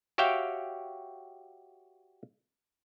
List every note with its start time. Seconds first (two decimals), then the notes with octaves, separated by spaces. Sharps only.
0.18 F#4 G4 C#5 E5 F5 G5